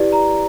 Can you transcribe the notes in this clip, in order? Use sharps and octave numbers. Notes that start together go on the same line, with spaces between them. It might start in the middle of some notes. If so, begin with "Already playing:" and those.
Already playing: E4 G4 B4 D5
A#5